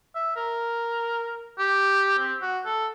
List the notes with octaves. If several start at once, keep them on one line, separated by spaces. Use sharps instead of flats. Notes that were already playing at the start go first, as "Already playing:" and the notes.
E5
A#4
G4
C4
F#4
A4